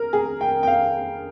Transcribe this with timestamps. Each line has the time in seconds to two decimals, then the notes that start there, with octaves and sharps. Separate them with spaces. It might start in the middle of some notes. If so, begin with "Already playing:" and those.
Already playing: A#4
0.13 G#4
0.41 G5
0.63 G5
0.67 F5